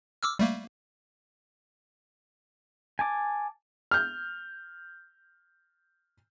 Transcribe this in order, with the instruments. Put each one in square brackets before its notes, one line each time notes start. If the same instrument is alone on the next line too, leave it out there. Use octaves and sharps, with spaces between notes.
[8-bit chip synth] D6 E6 F6
G3 A3 A#3
[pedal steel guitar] G#5 A5 D6
[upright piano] F6 G6